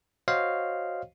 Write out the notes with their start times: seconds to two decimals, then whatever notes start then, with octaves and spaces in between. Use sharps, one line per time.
0.28 F#4 C5 C#5 D#5 F5